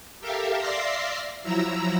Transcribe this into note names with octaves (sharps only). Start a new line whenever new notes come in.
G4 A4 A#4 E5 F5
D5 E5 F5 C6 A#6 C7
F3 F#3 E4 A#5 E6